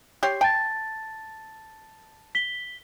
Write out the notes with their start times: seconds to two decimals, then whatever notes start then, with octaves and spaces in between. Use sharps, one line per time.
0.23 G4 C#5 C6
0.41 G5 A5 A6
2.35 B6 G7